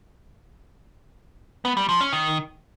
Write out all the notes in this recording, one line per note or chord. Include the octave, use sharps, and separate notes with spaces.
B3
G3
F3
C#4
D#3